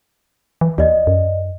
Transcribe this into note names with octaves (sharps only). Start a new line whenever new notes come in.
E3
D#2 D5 D#5
F#2